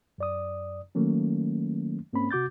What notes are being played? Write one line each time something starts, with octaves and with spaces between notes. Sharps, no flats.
F#2 D5 D#6
D#3 F#3 A3 A#3 C#4
G#2 A#3 C4 C#4 B5
C3 F#4 D6 G6 A6